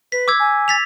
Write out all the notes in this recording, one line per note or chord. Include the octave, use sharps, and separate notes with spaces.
B4 B6
D6 E6 G#6
G#5
A6 B6 F7